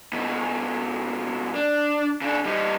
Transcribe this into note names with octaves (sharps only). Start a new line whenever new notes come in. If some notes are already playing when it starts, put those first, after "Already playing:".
F2 B2
D4
C#3 D4
G3 D#4